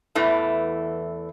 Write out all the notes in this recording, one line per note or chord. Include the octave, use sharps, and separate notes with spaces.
E2 E3 A3